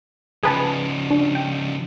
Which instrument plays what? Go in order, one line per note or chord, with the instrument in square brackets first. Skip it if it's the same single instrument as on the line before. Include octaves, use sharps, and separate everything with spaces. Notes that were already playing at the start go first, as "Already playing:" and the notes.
[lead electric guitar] C#3 F3 [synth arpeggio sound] G#4 B4 A5
[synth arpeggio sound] D4
G5